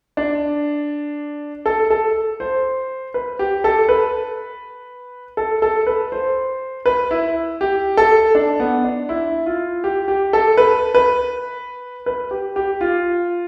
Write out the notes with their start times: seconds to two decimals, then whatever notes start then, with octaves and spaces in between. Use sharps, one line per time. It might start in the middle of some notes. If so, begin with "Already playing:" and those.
0.17 D4
1.66 A4
1.90 A4
2.40 C5
3.14 B4
3.39 G4
3.64 A4
3.89 B4
5.37 A4
5.62 A4
5.87 B4
6.12 C5
6.86 B4
7.11 E4
7.61 G4
7.97 A4
8.35 D4
8.60 B3
8.84 D4
9.09 E4
9.46 F4
9.84 G4
10.08 G4
10.33 A4
10.58 B4
10.95 B4
12.06 B4
12.31 G4
12.56 G4
12.81 F4